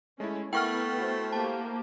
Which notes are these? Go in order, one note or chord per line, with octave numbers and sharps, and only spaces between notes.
G#3 A3 C#4 E4
A3 B3 E4 A#4 F#5 G5 C#6 F6
E4 F#4 C5
A#3 G4 A5